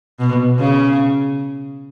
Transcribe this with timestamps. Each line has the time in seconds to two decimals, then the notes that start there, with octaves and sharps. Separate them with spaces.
0.20 B2
0.59 C#3